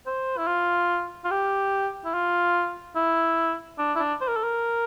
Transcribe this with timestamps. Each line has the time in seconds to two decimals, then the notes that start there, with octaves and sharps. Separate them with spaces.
0.06 C5
0.38 E4
0.47 F4
1.24 F4
1.31 G4
2.05 E4
2.14 F4
2.96 E4
3.79 D4
3.96 E4
3.99 D4
4.21 C5
4.28 A#4
4.36 A4
4.43 A#4